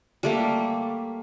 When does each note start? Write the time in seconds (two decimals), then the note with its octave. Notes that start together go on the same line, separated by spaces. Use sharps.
0.23 G3 A3 A#3